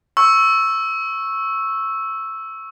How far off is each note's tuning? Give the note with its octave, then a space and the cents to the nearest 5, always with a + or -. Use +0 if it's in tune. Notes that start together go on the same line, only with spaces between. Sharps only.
C#6 -10 E6 +0